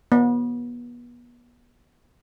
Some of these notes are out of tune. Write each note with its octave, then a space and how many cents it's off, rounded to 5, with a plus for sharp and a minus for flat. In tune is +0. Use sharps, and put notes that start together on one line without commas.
B3 -35